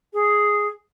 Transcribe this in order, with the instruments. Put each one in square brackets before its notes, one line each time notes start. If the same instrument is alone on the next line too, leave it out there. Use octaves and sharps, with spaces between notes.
[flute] G#4